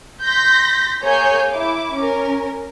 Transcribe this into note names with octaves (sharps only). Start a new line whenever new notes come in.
C6 G6 A#6 B6
A#3 G#4 C#5 G#5 G6
E4 D6
C#4 A#4